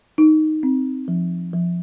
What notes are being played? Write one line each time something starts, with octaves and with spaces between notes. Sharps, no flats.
D#4
C4
F3
F3